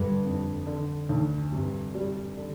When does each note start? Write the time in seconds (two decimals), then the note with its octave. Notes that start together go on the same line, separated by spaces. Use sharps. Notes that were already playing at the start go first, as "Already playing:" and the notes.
Already playing: G2 D3
0.25 F2
0.67 D3
1.09 D2
1.51 G2 C3
1.95 G3
2.37 D3